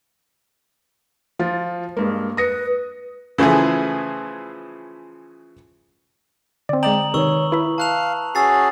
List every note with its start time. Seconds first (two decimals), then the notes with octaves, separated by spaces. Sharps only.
1.39 F3 F4
1.97 G2 G#3 A#3
2.37 B4 D#6 A#6 C#7
3.38 C#3 E3 F3 A3 G#4
6.69 D3 C4 D5
6.83 G#3 D5 G5 A#5 D#6 F#7
7.14 C3 D#3 B4 C#5 C#6 E6
7.52 E4 B4 E5
7.78 F5 A5 F#6 F7
8.35 C#4 F#4 G#4 E6 A6 C7